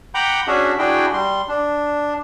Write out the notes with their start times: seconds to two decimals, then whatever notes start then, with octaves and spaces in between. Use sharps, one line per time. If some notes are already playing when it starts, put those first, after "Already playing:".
0.14 F#5 G5 A#5 B5 D6 G6
0.48 C#4 D4 F#4 G#4 E5
0.79 D4 E4 F#4 G#4 G5
1.13 G3 C6
1.48 D4